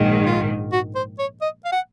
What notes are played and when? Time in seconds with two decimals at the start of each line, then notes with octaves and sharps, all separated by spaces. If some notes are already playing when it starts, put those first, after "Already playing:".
Already playing: A#1 G#2 D#3
0.26 F4
0.72 F#4
0.95 C5
1.19 C#5
1.41 D#5
1.65 F5
1.72 F#5